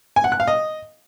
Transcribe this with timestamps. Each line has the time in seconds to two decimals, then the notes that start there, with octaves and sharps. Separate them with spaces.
0.16 G#5
0.24 F#5
0.32 F#6
0.40 F5
0.48 D#5